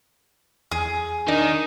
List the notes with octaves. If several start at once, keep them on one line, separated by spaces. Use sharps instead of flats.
E2 G#4
D#3 D4 D#4 D5 A#6